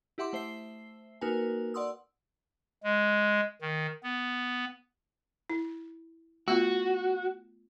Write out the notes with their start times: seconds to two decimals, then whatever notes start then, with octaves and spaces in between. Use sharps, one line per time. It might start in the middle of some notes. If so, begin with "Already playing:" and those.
0.18 E4 G4 E5 F#5 C6 D6
0.33 A3 C5 E5 C7
1.21 A#3 D#4 F#4 A#4 B4 G#5
1.74 D5 F#5 C6 D#6 E6
2.83 G#3
3.62 D#3
4.03 B3
5.50 E4
6.48 A3 B3 F4 F#4